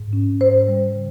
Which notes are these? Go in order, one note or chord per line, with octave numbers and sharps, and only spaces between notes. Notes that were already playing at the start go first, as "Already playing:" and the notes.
Already playing: G#2
C#4
G#2 C5
G3
C#3